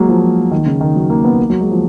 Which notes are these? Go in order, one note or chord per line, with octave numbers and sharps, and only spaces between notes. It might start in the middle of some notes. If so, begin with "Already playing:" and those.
Already playing: F#3 G#3 A#3
F3
D#3
C#3
D#3
F#3
A#3
B3
A#3
F#3
G#3
F3